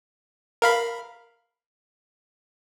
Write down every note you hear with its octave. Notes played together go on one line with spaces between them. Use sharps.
A#4 F5 B5